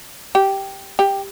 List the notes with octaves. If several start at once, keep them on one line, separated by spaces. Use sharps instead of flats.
G4
G4